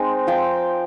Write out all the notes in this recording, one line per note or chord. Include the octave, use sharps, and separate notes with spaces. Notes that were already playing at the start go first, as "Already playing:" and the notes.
Already playing: G#3 C4 D#4
F3 F5 G5